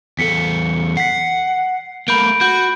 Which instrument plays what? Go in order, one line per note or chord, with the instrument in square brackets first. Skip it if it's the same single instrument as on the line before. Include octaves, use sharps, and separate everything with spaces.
[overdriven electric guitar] E2 A4 [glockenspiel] B6 C#7
[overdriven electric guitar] F#5 [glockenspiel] B6 C7
[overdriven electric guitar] A3 A#3 [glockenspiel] B5 G6 D7
[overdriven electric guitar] F#4 [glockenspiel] G6